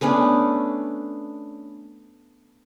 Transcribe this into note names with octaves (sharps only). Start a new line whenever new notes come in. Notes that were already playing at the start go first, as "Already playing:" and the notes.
A3 B3 C#4 D4